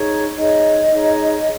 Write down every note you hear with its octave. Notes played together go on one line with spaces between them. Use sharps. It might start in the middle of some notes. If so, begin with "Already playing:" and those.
Already playing: D#4 G#4 C#5
D#4 G#4 C#5 D#5
D#4 G#4 C#5